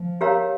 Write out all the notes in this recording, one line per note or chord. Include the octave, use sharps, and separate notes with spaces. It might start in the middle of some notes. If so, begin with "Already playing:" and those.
Already playing: F3
G4 A#4 C#5 F5 A#5